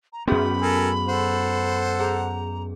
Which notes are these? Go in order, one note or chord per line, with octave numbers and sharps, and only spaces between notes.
A#5
F#2 B3 C#4 F#4 G#4 B5
A4 A#4 G#5
A4 C5 F#5
G#4 A#5